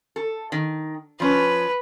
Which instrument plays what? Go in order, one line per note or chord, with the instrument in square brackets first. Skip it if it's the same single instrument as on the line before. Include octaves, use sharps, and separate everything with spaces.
[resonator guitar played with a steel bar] A4
D#3
[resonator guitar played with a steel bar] F3 C#4 [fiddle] B4